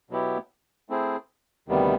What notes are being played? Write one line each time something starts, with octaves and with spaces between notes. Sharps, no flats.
B2 F#3 B3 E4 G4
A3 C4 E4 G#4 C5
D2 C3 D#3 G3 B3